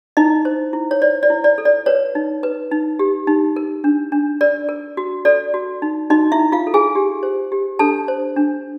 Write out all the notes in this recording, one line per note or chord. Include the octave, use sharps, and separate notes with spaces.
D#4 E4 D#5
C5
E4
C#5
C5 D5
D5
E4
D5
A4
D5
B4 C#5
D#4
B4
D#4
G4
D#4
A#4
D4
D4
A#4 D5
A#4
F#4
A4 D5
F#4
D#4
D#4 F#4 D#5
E4 E5
D#4
F4 F5
A4
G#4 G#5
G4
C5
G4
D4 A4 A5
C5
D4